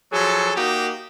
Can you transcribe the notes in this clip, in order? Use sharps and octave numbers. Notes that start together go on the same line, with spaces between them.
F3 F#3 G#4 A4
A#3 D#4 F#4 G4